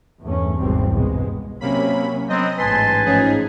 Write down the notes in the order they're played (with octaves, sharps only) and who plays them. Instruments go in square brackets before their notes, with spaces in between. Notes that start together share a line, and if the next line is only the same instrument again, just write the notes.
[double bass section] E2 G2 A3 C#4
G#1 E2 G#2 B2 G3 C4
C2 G2 B2 G#3 B3
[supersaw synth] C3 A#3 B5 [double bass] F#3 C#4
[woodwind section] F#3 B3 C4 [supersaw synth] D#5
[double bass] A1 G#2 [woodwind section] B4 G#5 A5 [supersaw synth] C6
[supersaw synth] F3 D#4 G#4 [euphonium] C#4